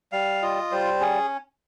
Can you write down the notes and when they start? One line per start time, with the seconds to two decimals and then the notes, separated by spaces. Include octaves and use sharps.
0.12 G3 F5
0.42 F4 D#5
0.71 G3 C5
1.01 C#4 G#4